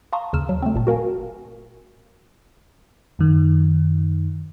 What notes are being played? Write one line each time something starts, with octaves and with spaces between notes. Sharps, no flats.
F5 A5 A#5 C6 C#6 D#6
D#2 C#3 E6 F6 E7
F#3
A3 C4
G1 A#2 A5
F#4 A#4 F5 G#5
F#2 D#3